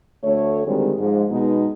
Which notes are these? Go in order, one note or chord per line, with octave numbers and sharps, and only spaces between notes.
D2 A3 C#5
D2 D#3 G3 G#3 C4
G#2 F3 G#3
B2 G#3 B3 D#4